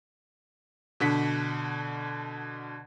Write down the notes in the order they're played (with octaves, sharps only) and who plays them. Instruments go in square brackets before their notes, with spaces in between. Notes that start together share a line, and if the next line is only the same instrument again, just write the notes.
[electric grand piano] B2 D3 F#5 B6